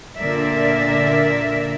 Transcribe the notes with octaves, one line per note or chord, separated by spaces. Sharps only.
A#2 D3 A#4 D5 E5